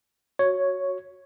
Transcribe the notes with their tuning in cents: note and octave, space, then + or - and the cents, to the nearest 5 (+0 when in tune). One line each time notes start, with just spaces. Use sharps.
F#4 +0 C#5 +0